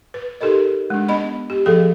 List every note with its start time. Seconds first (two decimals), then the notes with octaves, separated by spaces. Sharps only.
0.14 B4
0.41 D#4 G4 A4 A#4 D#5
0.90 G#3 D4
1.09 B3 D#5 B5
1.50 G4
1.66 F3 G#4 A4 F5 G5